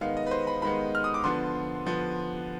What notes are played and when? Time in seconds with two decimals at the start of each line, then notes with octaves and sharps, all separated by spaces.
0.01 D#3 G#3 B3 F5
0.17 D#5
0.26 B4
0.31 C5
0.47 B5
0.62 D#3 G#3 B3 B5
0.95 F6
1.04 D#6
1.14 D6
1.24 D3 F3 B3 C6
1.85 D3 F3 B3